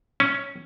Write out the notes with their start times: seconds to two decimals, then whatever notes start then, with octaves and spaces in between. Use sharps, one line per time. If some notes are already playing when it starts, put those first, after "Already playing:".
0.20 C#4